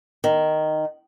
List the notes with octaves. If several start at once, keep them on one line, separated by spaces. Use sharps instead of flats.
D#3